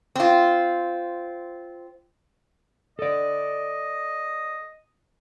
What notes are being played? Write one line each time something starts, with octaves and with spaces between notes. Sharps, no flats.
C4 F4
A4 D5 D#5